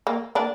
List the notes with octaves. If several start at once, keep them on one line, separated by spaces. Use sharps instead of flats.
A#3
A#3 D4